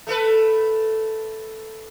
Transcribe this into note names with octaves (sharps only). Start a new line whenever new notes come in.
A3 A4 B4